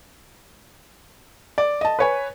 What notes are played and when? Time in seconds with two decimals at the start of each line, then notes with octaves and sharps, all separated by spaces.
1.58 D5
1.81 D#5 A5
1.99 B4 C#5 G#5